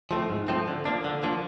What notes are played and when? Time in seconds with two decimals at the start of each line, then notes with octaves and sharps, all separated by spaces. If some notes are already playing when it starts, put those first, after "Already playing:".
0.11 F3 A3 C4
0.30 G#2
0.48 F3 A3 C4
0.67 D3
0.85 F3 A#3 D4
1.04 D3
1.23 F3 A#3 D4